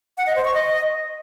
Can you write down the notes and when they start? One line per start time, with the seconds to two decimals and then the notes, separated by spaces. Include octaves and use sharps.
0.18 F#5
0.27 D#5
0.36 C5
0.45 C#6
0.54 D#5